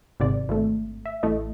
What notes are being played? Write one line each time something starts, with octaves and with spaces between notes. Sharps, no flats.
G#1 G#2 C3 D5
G#1 A3
E5
A1 A3 E4 D#5